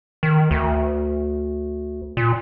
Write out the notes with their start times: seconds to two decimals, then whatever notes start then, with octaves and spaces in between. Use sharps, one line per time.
0.23 D#3
0.51 D2
2.17 A#2